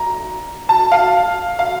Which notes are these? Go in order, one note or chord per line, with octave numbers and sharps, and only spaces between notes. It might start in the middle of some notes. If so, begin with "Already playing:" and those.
Already playing: A#5
A5
F5
F5